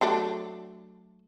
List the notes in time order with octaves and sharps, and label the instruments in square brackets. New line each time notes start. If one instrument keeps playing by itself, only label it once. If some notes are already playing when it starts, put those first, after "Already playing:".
[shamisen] F#3 A3 D4